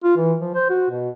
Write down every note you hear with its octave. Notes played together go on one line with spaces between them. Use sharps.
F4
E3
F3
C5
F#4
B2